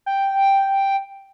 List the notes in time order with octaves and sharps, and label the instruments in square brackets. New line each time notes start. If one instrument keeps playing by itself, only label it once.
[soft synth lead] G5